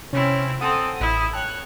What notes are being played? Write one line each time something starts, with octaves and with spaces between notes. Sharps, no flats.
C3 C4 C#4 E4
C4 A4 F#5 G#5 C6 D#6
A1 E4
C#5 G5 A5 F#6